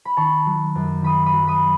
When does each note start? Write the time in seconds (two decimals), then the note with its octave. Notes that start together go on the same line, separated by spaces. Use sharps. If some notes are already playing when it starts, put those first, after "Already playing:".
0.05 B5
0.17 D#3 A5 C#6
0.46 F#3
0.75 F#2
1.02 D#3 B5 D#6
1.26 B5 D#6
1.33 F#3
1.47 B5 D#6